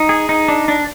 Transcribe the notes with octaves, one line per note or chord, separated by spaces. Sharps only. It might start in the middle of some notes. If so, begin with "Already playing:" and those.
Already playing: D#4
G#4
D#4
D4
D4